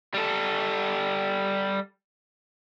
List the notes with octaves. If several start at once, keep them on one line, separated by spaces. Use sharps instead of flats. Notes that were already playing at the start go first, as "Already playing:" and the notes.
G3 A4